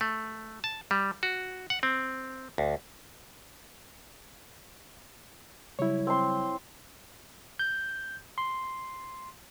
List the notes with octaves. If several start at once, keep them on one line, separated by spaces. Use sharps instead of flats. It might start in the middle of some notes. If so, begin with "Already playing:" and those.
A3
A5
G3
F#4
F#5
C4
D2
C#3 F#3 G3 E4 C#5
C4 C6
G6
C6